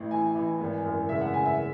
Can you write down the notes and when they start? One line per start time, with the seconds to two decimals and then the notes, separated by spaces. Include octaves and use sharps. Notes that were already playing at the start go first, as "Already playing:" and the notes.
Already playing: A1 A2
0.11 E3 G#5
0.36 E3
0.61 G#1
0.84 F#2
1.09 C#3 E5
1.21 F#5
1.33 C#3 G#5
1.45 E5